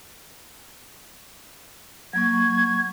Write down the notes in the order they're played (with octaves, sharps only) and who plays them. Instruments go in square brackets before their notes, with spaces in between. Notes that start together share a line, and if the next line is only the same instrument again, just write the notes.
[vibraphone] F#3 A#3 C#6 [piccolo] G#6